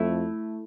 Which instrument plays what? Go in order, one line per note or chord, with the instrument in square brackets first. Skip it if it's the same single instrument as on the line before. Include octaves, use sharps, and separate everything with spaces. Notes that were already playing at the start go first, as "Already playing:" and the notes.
Already playing: [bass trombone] F2 [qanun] A3 E4